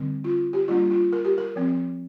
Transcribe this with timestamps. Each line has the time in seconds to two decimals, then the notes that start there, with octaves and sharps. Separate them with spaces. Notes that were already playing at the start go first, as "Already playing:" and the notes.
Already playing: D3 G3 C4
0.24 F4
0.53 G4
0.68 G3 A#3 D4 F4
0.91 F4
1.13 A#4
1.25 G4
1.38 A#4
1.56 F3 C4